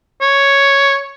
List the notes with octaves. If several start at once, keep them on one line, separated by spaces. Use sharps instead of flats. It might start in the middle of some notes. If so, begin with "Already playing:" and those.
C#5